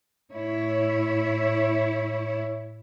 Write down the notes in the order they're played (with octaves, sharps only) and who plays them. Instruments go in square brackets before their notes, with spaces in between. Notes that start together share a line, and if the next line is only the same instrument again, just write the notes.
[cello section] A2 E4 C#5